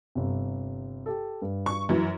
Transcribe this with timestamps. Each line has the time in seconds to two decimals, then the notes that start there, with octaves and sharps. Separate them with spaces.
0.15 G1 C3
1.06 G4 A4
1.42 G2
1.66 C#6
1.89 F#2 E3